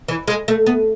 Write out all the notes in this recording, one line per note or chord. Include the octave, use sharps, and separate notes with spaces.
E3
G#3
A3
B3